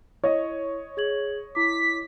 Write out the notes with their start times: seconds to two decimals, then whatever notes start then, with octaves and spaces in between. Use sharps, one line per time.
0.24 E4 C#5 D#5
0.97 G#4 G#6 F#7
1.55 E4 D6 B6